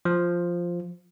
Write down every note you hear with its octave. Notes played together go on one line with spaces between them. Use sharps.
F3